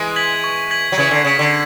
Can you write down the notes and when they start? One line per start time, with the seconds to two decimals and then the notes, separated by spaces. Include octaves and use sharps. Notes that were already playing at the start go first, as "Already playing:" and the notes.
Already playing: E3 G#3
0.16 G#6 B6 F#7
0.44 C#6
0.71 G#6 B6 F#7
0.92 F#3
0.98 C#3 E3 G#6
1.11 D3
1.24 C#3 B6 E7
1.39 D3